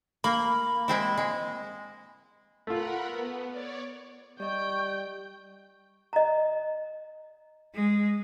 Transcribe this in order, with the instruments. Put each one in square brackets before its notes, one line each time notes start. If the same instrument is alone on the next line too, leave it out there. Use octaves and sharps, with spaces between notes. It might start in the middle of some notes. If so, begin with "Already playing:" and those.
[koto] A#3 [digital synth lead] B5
[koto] G#3 C4 E4
G#3
[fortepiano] A3 F4 [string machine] A#4 F#5 B5
[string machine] B3
C#5 D5
[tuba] G3 [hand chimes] D5 D#5 [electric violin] G5 G6 [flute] C#6
[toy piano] D#5 A#5
[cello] G#3